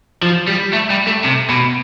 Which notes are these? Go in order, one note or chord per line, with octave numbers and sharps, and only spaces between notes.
F3
G3
A3
G3
A3
C3
B2